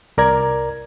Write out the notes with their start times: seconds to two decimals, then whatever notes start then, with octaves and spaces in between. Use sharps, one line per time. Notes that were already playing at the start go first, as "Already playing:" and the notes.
0.18 C2 A#4 D5 A#5 G#6